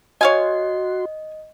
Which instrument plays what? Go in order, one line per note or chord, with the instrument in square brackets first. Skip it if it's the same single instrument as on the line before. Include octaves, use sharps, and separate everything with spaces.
[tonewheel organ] F#4 C6 [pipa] C#5 F5 G#5 [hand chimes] D#5